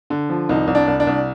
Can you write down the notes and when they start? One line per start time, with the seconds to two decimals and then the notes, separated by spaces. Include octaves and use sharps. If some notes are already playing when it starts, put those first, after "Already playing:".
0.10 D3
0.29 F3
0.49 C2 D#4
0.67 C2
0.75 D4
0.87 C2
1.00 D4
1.07 C2